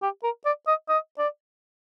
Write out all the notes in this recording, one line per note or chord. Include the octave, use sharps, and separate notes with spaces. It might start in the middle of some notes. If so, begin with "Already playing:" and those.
G4
A#4
D5
D#5
D#5
D5